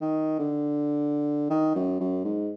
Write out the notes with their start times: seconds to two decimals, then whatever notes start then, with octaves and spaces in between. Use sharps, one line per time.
0.01 D#3
0.39 D3
1.50 D#3
1.75 F#2
2.00 F#2
2.24 G#2